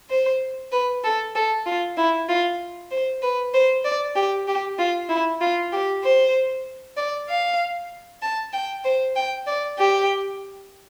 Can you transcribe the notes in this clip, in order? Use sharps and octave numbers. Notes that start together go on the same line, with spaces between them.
C5
B4
A4
A4
F4
E4
F4
C5
B4
C5
D5
G4
G4
F4
E4
F4
G4
C5
D5
F5
A5
G5
C5
G5
D5
G4